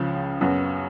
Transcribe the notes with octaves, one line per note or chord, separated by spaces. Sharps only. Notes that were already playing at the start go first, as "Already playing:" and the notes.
Already playing: C#2 C#3 F3
F#2 C#3 F#3 B3 F#4